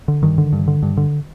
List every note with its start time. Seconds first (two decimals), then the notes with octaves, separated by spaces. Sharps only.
0.08 D3
0.23 G2 D#3
0.38 D3
0.53 G2
0.68 D3
0.83 G2
0.97 D3